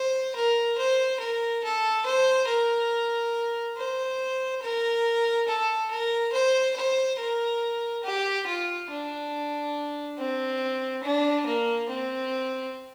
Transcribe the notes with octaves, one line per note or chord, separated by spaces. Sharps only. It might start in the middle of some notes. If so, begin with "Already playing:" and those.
Already playing: C5
A#4
C5
A#4
A4
C5
A#4
C5
A#4
A4
A#4
C5
C5
A#4
G4
F4
D4
C4
D4
A#3
C4